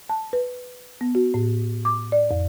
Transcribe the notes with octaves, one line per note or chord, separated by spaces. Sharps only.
A5
B4
B3
F#4
A2
D6
D5
F2